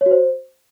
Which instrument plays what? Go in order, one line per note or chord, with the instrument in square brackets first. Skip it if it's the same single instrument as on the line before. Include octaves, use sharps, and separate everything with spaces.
[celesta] C#5
F#4
C5